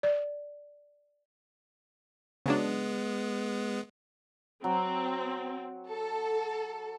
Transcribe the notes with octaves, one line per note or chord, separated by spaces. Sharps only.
D5
C#3 F#3 G#3 B3 D4
F#3 C4
A4